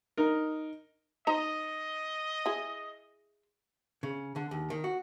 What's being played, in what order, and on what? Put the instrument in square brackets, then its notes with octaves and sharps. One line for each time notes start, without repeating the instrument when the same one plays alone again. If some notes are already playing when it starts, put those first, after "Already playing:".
[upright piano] D#4 A#4
[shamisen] D#4 C5 A#5 [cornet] D#5
[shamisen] E4 G#4
[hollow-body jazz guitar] C#3
D3
D#2
D#3
F#4